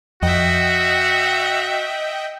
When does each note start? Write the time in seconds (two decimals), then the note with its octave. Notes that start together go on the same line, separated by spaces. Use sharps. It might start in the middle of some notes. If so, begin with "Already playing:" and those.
0.22 F2 F#4 D#5 E5 F#5 G5